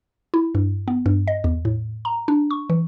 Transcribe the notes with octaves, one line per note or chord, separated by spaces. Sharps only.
E4
G2
B3
G2
D#5
E2
A2
A#5
D4
C#6
E3